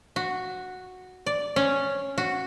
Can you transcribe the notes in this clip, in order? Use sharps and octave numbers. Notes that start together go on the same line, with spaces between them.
F#4
D5
C#4
F#4